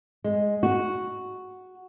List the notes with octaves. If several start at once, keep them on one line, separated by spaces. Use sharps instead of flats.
G#3
F#4